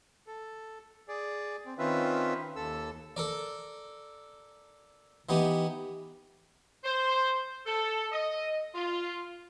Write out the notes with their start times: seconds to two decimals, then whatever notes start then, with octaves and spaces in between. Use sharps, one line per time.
0.27 A4
1.08 G#4 D5
1.66 C4
1.78 D#3 C4 C#4 F4 B4 E5
2.56 D#2 A4 E6
3.17 A4 A#4 D5
5.29 E3 B3 D#4 G4
6.84 C5
7.66 A4
8.12 D#5
8.74 F4